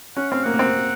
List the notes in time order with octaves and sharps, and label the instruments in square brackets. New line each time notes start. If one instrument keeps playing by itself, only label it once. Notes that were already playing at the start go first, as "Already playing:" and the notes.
[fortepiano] C#4 [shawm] F#5
[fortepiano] C4 [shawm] F5
[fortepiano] A#3 [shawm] F#5
[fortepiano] A#3
C4